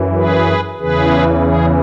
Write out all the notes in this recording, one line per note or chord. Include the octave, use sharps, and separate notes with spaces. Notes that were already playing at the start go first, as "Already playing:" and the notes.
Already playing: F#2 E3
G#4 B4
E2 C#3 E3 G#4 B4
G#4